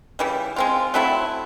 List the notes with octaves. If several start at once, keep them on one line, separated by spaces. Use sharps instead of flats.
C#3 E3 G3
G#3 C4 F4
F#3 A3 C4 E4